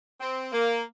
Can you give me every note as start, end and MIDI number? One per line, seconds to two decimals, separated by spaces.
0.21 0.47 60
0.52 0.81 58